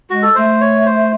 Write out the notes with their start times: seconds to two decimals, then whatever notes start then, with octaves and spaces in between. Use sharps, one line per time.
0.10 G#3 F#4
0.23 A4
0.35 A3 C5
0.61 C#5
0.86 C5